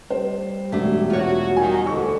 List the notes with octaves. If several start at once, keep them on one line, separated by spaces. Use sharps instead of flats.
G3 C5
E1 A3 D4
F4 F#4 C#5
D#3 F#3 G3 D#4 G#5
D2 D3 C#6